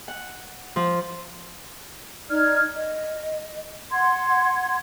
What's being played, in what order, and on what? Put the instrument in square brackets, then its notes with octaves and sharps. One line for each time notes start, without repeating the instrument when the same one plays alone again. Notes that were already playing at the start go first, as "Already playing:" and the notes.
[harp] F#5
F3
[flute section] D#4 D5 F6 G#6
D#5
F#5 C6 G#6